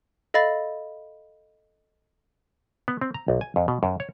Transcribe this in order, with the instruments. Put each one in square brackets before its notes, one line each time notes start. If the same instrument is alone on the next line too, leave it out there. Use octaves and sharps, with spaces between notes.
[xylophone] A4 D#5 F5 B5 A6
[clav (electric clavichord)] B3
C4
A#5
B1
G#5
F2
B2
F#2
C#5